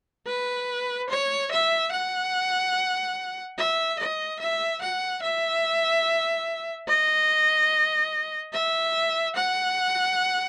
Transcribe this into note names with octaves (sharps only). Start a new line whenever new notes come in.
B4
C#5
E5
F#5
E5
D#5
E5
F#5
E5
D#5
E5
F#5